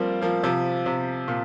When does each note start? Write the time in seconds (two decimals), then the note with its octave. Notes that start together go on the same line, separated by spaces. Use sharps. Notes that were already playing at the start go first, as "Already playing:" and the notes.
Already playing: F3 G3 A#3 C4
0.21 F3 A#3
0.43 C3 F3
0.86 C3
1.28 A#2